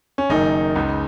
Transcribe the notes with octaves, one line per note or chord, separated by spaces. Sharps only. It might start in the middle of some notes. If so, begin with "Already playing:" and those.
C#4
F#1 F#2 D#3 D#4
C#2 C#3